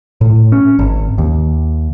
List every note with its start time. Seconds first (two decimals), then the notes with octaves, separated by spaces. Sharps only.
0.21 A2
0.52 C#4
0.79 G#1
1.18 D#2